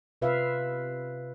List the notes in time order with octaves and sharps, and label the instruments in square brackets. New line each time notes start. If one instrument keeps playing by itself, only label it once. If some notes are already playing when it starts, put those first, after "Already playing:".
[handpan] C3 F4 B4 E5 F5